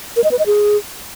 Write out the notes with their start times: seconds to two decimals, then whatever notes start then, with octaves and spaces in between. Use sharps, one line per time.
0.16 A#4
0.24 D#5
0.31 B4
0.39 D#5
0.46 G#4